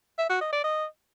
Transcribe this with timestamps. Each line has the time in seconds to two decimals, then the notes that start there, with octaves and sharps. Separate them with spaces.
0.18 E5
0.30 F#4
0.41 D#5
0.52 D5
0.64 D#5